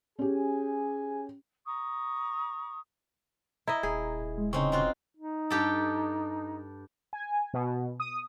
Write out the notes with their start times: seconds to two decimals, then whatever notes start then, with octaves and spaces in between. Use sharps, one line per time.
0.19 C#4 G4 G#4 G#5
1.66 A#5 C#6 D#6
3.68 E4 D#5 A#5
3.83 D#1 G#4
4.38 G#3
4.53 C#3 C4 C#4 D#4 C#6
4.72 C4 F4 F#4
5.17 D#4
5.50 G2 G4 A4
7.13 G#5
7.54 B2
8.00 D#6